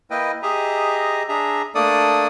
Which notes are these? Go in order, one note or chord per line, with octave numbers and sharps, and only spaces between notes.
A#3 E4 B4 D#5 G5
G4 G#4 D#5 E5 A#5
D4 G#4 E5 A#5
A3 A#3 D4 A4 D5 D#6